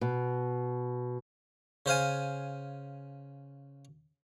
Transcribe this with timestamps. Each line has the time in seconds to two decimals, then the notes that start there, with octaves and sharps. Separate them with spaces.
0.01 B2
1.86 C#3 C5 F5 G#5